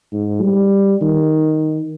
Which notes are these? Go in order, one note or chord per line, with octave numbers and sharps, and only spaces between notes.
G#2
G3
D#3